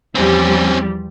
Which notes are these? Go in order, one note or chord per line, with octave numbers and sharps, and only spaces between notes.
E2 F3 G3 C4 C#4